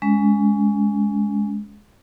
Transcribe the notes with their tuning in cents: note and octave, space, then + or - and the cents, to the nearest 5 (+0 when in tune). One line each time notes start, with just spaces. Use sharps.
G#3 +0 C#4 +30